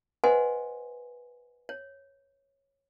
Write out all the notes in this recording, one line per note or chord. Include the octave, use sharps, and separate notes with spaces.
B4 C5 D#5 F#5 G#5 C6
C#5